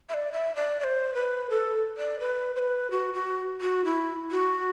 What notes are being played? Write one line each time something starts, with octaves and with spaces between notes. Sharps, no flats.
E5
D5
E5
D5
D5
C5
B4
A4
D5
B4
C5
B4
F#4
F#4
F#4
E4
F#4